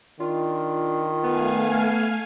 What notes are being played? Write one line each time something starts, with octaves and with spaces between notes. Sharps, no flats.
D#3 D4 F4
A3 B3 F5 G#5